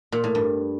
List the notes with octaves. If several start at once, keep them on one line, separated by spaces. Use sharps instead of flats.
A#2
A2
G2